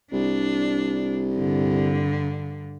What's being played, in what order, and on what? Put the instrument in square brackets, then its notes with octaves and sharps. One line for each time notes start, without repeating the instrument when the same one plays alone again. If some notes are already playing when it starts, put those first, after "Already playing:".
[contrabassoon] C2 [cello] D4
[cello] G2 D3